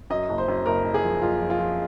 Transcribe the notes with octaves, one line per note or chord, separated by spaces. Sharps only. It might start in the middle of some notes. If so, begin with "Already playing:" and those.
F#2 D#5
F#1
C5
F#2
F#1 A#4
F#1
G#4
F3
F#1 F4
F3
F4
F3